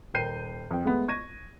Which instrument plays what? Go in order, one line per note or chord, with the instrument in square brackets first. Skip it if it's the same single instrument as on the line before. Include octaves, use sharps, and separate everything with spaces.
[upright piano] D#1 A#4 G5 G6 C7 D#7
F2 G5
G#3 A3 B3
C#6 G#6 A#6 D#7